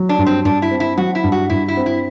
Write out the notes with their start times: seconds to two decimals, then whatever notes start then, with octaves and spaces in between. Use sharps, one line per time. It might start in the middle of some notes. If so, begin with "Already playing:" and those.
Already playing: F#3
0.09 D4
0.18 G2
0.27 C4
0.45 G2 D4
0.62 E4
0.71 C4
0.80 E4
0.98 F#3 F#4
1.15 E4
1.24 G2
1.32 F#4
1.50 G2 E4
1.68 E4
1.77 C4
1.86 E4